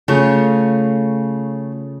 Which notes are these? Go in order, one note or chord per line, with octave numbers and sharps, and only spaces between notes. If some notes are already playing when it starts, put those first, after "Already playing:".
C#3 A3 F4 C#5